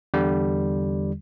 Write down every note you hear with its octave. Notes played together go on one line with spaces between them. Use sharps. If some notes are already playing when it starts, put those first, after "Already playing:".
E2 D3 G3